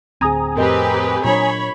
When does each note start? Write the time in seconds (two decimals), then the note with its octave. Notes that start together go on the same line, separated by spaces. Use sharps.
0.21 D1 D2 C4 G#4 G#5 A#5 D#6
0.57 F2 A2 C4 G4 A#4 B4 D#5
1.24 A#2 F#3 D4 F4 C#5 B5